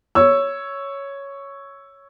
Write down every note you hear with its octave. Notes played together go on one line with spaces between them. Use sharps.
C#5 E6